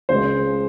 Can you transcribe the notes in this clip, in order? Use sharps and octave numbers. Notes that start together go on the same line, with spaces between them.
C#2 C#3 G#3 C5